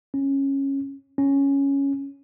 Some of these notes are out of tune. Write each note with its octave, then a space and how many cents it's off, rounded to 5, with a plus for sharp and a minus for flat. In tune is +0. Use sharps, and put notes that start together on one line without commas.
C#4 -15
C#4 +0